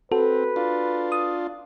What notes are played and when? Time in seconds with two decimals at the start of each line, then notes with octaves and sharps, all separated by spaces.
0.12 C4 F#4 A4 B4
0.56 D4 F4
1.12 D#6